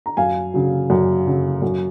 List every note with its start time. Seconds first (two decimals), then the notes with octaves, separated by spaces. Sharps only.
0.06 A#5
0.17 F#2 F5 G#5
0.54 C#3 F#3
0.90 F#2
1.27 C#3 F#3
1.62 F#2